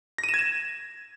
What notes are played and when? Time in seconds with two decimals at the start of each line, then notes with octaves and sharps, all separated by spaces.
0.18 A#6
0.24 D#7
0.29 E7
0.34 G#6
0.39 E7